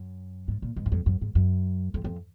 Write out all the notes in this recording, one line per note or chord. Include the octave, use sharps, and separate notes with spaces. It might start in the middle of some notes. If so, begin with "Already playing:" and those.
Already playing: F#2
G#2
A#2
G#2
F#2
F2
F#2
G#2
F#2
F2
F2